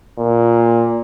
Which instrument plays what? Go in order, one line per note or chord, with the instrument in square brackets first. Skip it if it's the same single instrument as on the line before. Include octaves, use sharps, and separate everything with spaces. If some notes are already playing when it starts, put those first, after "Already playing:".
[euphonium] A#2